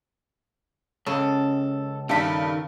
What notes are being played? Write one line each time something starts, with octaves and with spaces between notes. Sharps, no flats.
C#2 C#3 A4
G2 D#3 A3 F5 A5 B5